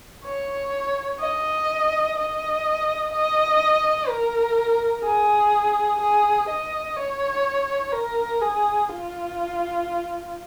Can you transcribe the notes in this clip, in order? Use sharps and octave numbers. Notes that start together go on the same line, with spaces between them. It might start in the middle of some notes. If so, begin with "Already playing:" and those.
C#5
D#5
D#5
D#5
A#4
G#4
G#4
D#5
C#5
A#4
G#4
F4